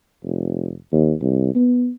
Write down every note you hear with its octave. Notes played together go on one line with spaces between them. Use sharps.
F1
D#2
C2
B3